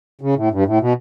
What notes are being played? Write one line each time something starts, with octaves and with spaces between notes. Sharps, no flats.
C#3
A2
G2
A2
B2